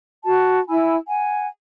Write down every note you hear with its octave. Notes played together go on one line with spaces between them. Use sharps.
F#4 A5
E4 G#5 B5 E6
F#5 G#5